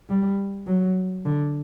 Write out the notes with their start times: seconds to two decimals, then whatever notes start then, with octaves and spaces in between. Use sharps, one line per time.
0.09 G3
0.67 F#3
1.25 D3